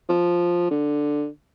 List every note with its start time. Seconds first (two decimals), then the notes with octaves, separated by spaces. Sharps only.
0.09 F3
0.71 D3